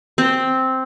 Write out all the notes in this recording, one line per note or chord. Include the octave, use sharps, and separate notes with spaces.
C4